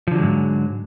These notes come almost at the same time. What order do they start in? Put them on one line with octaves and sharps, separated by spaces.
F3 D3 F#3 G#3 G#2